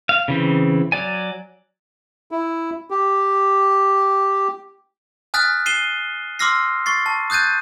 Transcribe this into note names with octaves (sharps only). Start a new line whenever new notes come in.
F5
C#3 E3 C4
F#3 D5 G#5
E4
G4
G#5 D#6 F6 F#6 A6 B6
G#5 C7 D#7 E7 G7
C6 D6 E6 F6 A#6 C7
C#6 A6 C7
A5
D#6 F#6 G6 A6 D#7